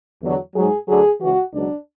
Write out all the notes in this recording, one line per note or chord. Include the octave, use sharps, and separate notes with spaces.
E2 D3 F#3
G#2 F#3 G#4
D2 D3 F#3 G#4
C#2 C#3 E3 F#4
C#2 B2 F#3 D4